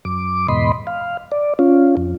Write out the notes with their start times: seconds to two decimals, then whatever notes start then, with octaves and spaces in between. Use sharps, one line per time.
0.05 F#2 D6
0.48 E2 G#2 B2 D#5 B5 C6
0.87 F5
1.32 D5
1.59 C#4 F4
1.97 F2